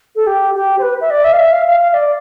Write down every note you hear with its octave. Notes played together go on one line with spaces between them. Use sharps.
A4
G4
G4
C5
B4
E5
D5
E5
F5
E5
F5
F5
F5
D5